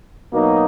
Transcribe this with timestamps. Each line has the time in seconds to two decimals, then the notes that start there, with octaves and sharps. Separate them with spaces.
0.33 B2 F#3 A#3 D#4